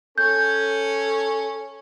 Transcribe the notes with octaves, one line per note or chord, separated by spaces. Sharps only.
C#4 A4 G6